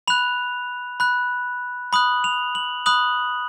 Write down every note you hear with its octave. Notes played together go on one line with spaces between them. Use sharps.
B5 F#6 F7
B5 F#6
B5 D#6 F#6 F#7
F7
F#7
B5 D#6 F#6 F#7